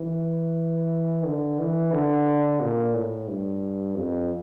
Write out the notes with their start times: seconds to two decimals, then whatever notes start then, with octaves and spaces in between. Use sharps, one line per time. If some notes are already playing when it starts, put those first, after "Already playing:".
Already playing: E3
1.25 D3
1.59 E3
1.93 D3
2.60 A#2
2.94 A2
3.28 G2
3.96 F2